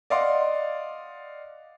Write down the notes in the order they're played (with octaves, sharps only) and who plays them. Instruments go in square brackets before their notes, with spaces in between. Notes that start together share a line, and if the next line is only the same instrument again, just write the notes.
[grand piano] D5 D#5 F5 F#5 C6